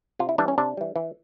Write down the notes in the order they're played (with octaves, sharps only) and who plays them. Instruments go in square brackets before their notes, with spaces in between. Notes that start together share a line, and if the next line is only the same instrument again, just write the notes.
[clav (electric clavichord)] C3 F4
E4
E3 G3 D4
C#4
C3 D4
E3 G3
E3